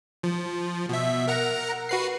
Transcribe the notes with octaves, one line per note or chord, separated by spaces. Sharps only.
F3
B2 E5
A#4 F#5 A#5
F#4 B4 C7